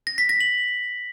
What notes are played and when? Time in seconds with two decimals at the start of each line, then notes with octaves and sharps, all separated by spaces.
0.07 A#6
0.18 B6
0.29 A#6
0.40 F#7